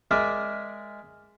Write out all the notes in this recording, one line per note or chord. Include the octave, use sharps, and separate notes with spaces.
G#3 A#4 D5 E5 D#6